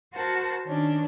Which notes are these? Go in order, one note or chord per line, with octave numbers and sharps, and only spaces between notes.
F#4 A#4 C5 F#5 A5
D#3 C#4 D4